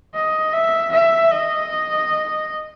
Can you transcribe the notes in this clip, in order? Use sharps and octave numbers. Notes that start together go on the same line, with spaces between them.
D#5
E5
E5
D#5